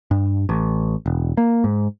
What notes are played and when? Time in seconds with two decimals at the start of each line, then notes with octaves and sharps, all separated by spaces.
0.11 G2
0.49 A1
1.06 E1
1.37 A#3
1.64 G#2